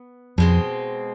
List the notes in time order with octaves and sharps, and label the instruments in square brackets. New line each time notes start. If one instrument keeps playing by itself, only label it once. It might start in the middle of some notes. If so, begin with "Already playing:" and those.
Already playing: [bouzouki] B3
[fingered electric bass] F2 [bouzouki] B2 G#3 C4